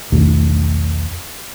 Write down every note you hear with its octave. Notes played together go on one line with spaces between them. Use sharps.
B1 E2 D#3 A3